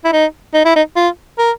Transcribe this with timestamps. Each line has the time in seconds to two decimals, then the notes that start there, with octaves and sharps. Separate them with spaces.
0.05 E4
0.13 D#4
0.54 D#4
0.65 E4
0.76 D#4
0.96 F4
1.39 A#4